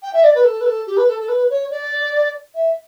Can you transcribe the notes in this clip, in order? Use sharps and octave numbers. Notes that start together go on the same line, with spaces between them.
G5
E5
D5
B4
A4
B4
A4
G4
B4
A4
A4
B4
C#5
D5
E5